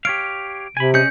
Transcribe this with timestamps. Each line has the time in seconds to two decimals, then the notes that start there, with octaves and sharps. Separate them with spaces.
0.05 G4 C#5 F5 D7
0.77 C3 G#5 B5
0.94 C#4 G#4 D#5 G6 C#7